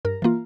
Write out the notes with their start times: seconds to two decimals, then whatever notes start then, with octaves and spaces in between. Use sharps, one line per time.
0.05 G2 A#4
0.22 E3 A#3 F4